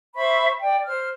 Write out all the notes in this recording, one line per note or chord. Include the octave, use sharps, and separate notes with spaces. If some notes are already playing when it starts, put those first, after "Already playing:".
C5 E5 B5 C#6
D5 G5
C5 F6